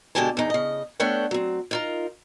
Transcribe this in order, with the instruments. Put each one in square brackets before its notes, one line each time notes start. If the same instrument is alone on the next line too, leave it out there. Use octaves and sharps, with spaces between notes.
[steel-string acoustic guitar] B2 D3 G#3 G4 G#5 A5
E2 D#4
C#3 D#5
A3 B3 D4 C#5 F#5 G5
F#3 C4
D#4 F4 A#4